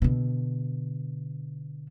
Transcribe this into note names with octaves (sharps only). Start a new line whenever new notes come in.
B2 D3